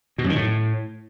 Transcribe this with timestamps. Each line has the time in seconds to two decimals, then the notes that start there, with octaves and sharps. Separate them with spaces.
0.18 B2
0.24 F#2
0.30 D#3
0.35 A2